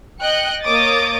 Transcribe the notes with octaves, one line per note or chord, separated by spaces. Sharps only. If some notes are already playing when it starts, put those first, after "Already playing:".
D#5 G5 F#6 C#7
A#3 C#5 D#5 D6 D#6 A6